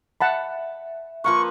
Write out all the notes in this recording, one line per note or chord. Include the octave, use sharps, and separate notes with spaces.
E5 F#5 A5 B5
F3 A#3 B4 C#6